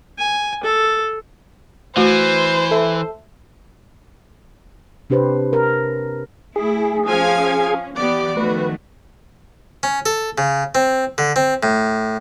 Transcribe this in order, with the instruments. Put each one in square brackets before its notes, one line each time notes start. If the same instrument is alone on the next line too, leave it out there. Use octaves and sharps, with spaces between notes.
[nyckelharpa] G#5
A4
[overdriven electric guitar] E3 [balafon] A3 F#4 [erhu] C5
[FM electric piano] A4 E5
[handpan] C3 D4 G4 B4 C5
A#4
[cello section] A3 E4 [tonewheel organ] G#4
[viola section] F3 F5 G#5 [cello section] C#4
[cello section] E3 [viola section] B3 G4 D5
[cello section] D#3 F3 A3 [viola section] F#4 [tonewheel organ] B4
[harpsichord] C#4
A4
C#3
C4
D3
C4
A2